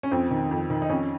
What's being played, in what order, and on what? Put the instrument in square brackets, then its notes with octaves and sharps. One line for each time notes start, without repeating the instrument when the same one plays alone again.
[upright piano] C#4
F2 C4
D#3
F2
D#3
D#4
F2 C#4